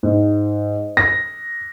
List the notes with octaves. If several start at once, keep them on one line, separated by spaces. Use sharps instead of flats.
G#2
A#6